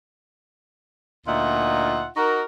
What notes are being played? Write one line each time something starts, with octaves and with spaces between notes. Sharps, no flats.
D2 A#2 D#4 F4 E5 F#5
D#4 F#4 A#4